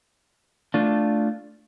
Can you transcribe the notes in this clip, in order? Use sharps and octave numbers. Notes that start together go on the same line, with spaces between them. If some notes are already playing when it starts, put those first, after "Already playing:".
A3 D4 F4